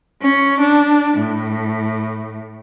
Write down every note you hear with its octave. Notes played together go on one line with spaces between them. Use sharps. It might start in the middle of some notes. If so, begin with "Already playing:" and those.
C#4
D4
A2